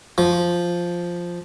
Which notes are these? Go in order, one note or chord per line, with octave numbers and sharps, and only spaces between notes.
F3